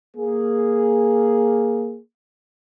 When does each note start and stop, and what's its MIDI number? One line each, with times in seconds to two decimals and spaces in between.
0.16 1.99 58
0.16 1.99 68